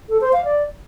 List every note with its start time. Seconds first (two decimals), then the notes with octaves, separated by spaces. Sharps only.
0.09 A4
0.21 C5
0.33 F5
0.45 D5